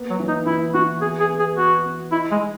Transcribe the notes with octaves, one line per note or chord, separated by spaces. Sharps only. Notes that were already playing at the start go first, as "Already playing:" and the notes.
Already playing: A#3 B3
F#3
E3
D#4
E3 E4
E3 F#4
B3 G#4
G#4
B3
G#4
B3 F#4
B3
D#4 E4
G#3
D#4